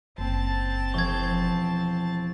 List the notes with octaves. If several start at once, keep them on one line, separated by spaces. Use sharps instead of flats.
F#1 C4 A5
E1 F3 C#6 G#6